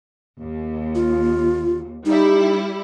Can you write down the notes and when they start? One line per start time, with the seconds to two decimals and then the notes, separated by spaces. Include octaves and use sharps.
0.41 D#2
0.95 F4
2.06 G3 D#4 E4